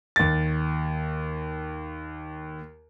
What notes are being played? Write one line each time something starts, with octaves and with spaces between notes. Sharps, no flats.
D#2 A6